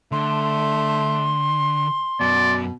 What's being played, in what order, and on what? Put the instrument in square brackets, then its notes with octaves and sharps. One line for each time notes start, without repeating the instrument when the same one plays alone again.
[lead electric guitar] D3 [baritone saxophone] A3 [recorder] C6
[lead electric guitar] F#2 F#4 [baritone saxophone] B2 [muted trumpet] D5